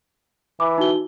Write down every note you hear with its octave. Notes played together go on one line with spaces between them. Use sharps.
E3 B5 D6
D#4 F#4 G7